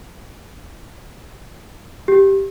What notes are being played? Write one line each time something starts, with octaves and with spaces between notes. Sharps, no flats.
G4